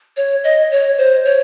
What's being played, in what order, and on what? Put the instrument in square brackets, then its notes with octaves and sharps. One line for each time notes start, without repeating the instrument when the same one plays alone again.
[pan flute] C#5
D#5
C#5
C5
C#5